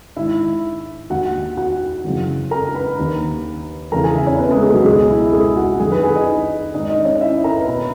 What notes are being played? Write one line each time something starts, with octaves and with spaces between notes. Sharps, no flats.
G#2 D#3 E4 E5
D#2 D#3 F#4 F#5
F#4 F#5
F#2 C#3 E3
A#4 A#5
B4 B5
D#2 D#3
E2 C#3 E3 A#4 A#5
G#4 G#5
E4 E5
C#4 C#5
B3 B4
G#3 G#4
G#3 G#4
F#3 F#4
C#2 B2 G#3 G#4
E4
G#3 G#4
F#4 F#5
F#2 D#3 G#4 G#5
B4 B5
G#4 G#5
D#4 D#5
G#2 D#3 D#4 D#5
D#4 D#5
C#4 C#5
E4 E5
A#4 A#5
B4 B5
B2 B4 B5